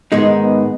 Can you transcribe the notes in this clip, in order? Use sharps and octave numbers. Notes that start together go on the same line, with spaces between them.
G#2 D#3 G#3 B3 D#4
B3